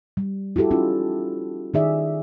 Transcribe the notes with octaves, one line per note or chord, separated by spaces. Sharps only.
G3
E4 F#4 G4 A4
C#4 D#4 F4
D#3 D#4 G#4 D5 E5